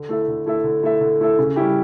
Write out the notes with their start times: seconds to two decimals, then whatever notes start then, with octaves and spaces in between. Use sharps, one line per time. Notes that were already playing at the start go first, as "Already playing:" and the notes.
Already playing: D3
0.09 A3 E4 A4 E5
0.28 D3
0.46 A3 E4 A4 E5
0.64 D3
0.83 A3 E4 A4 E5
1.01 D3
1.20 A3 E4 A4 E5
1.39 C#3
1.56 G3 C#4 E4 G4